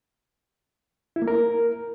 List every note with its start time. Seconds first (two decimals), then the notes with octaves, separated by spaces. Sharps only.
1.16 E4
1.22 A#3
1.28 A#4